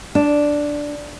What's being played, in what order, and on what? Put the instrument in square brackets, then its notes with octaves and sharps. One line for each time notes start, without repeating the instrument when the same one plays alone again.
[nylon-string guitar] D4